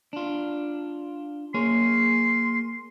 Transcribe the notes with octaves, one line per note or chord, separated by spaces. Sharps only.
D4 F4
A#3 G#4 C#5 C6